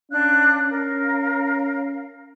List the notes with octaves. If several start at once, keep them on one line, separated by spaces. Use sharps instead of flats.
C#4 D4 F5 F#6
A#4 F5